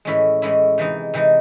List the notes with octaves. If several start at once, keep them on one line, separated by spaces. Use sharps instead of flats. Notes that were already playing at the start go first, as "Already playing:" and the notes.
A2 E3 G#3 C#4 E4
A2 E3 G#3 C#4 E4
C3 E3 G#3 D#4
C3 E3 G#3 D#4